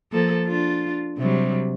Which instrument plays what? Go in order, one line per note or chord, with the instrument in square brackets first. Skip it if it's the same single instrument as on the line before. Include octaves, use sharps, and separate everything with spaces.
[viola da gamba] F3 A#3 A4
D4 F4
C3 F#3 G3